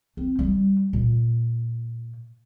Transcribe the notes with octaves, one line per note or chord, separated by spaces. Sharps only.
C4
G3
A#2